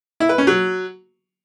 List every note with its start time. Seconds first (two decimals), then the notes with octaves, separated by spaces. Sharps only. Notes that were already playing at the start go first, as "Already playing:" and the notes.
0.20 E4
0.29 B4
0.38 C#4
0.47 F#3